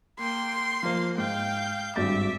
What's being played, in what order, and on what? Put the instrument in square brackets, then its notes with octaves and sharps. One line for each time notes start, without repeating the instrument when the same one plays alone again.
[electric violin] A#3 G5 [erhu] C6
[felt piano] F3 C5 [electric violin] A#3 F5
[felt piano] G#2 [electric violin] F5 G5 [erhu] G6
[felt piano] G#1 G2 A6 [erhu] E5 [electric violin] D6